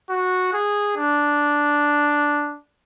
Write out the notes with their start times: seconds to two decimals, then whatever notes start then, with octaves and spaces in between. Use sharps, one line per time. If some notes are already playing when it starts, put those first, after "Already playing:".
0.10 F#4
0.54 G#4
0.96 D4